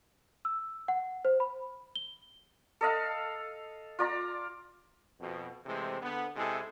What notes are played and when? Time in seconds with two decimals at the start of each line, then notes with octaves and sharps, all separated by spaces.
0.45 E6
0.88 F#5
1.25 C5
1.40 B5
1.95 G7
2.81 A4 D#5 F5
3.99 F4 D5 A#5
5.19 F2 B2
5.66 C3 E3 G#3 A3 C5
6.02 D3 B3
6.36 C3 G#3 E4 G#4 A4